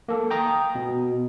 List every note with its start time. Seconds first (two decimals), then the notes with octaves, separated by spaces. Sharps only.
0.09 A#3 A4
0.30 G5 A#5 D#6
0.75 B2